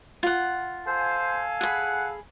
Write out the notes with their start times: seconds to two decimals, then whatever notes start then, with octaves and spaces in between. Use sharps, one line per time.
0.23 F4 F#5
0.87 A4 C5 F5 G#5
1.61 G#4 F#5 B5